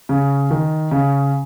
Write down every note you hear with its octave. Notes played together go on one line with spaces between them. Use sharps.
C#3
D#3
C#3